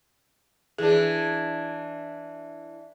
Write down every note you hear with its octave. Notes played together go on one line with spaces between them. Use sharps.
E3 D4 G#4